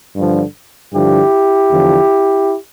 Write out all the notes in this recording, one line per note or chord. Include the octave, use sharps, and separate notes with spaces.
G2 D3 F3
G2 D3 F3 E4 G4
E2 D3 F3